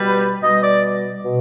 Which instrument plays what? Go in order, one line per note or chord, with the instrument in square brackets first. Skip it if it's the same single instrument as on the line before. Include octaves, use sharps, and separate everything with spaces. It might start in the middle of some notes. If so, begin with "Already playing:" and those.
Already playing: [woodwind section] B2 G3 B4
B2 G3 D#5
D5
B2